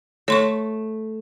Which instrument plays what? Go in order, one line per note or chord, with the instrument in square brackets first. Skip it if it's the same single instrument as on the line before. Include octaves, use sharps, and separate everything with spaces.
[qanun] A3 [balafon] C#5 C6 C#6